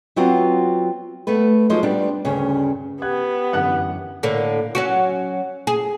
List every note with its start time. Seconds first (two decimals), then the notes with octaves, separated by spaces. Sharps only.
0.16 F#3 B3 C4 F4 F#4
1.27 A3 B3 B4
1.70 F3 F#3 G#3 D#4 C5
1.83 G3 B3 D4
2.25 D2 G2 C#3 C#4
3.02 B3 G4 F#5 F#6 G#6
3.53 F#2 D3 E3 F#5 F#6
4.23 A2 D3 A#3
4.75 F#3 C#4 F#4
5.67 G#4